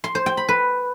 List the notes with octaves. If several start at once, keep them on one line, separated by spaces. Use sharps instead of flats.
C6
C5
G5
B5
B4